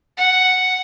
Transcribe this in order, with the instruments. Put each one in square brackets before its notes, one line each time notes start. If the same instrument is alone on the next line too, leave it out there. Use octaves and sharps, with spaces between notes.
[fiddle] F#5